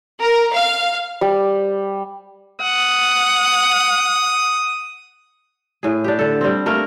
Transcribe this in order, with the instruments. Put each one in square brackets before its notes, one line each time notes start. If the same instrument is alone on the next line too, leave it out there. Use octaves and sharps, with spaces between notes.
[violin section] A#4
F5
[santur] G3
[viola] F#5 [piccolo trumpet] D#6
[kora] A2 G#4
D4 G4
D3 A4
G3 C4
A3 A#3 A#4